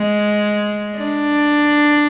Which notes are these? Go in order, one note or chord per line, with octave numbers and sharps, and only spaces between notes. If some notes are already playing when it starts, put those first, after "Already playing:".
Already playing: G#3
D4